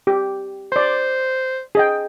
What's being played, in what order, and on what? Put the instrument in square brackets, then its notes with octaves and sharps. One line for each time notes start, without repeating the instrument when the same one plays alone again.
[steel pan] G4
[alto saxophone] C5 [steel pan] D5 C6
[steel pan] G#4 D#5 G5